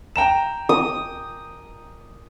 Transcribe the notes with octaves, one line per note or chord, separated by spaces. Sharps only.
G5 A#5 E7
D#6